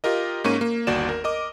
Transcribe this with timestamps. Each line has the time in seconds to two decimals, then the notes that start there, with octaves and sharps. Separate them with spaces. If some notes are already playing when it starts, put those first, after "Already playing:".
0.04 F4 G4 A#4 D#5
0.44 G#2 A#3 C#4 C#6 D#7
0.61 A#3
0.87 G1 D#2 F#4 D5 E7
1.09 A#4
1.24 A#4 D#5 D6